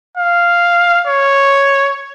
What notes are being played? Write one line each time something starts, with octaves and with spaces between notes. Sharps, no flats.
F5
C#5